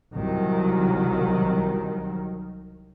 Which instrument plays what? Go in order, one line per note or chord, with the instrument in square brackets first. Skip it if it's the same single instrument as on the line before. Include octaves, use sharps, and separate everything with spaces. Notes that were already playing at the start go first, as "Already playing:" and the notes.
[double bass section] C2 D#3 F#3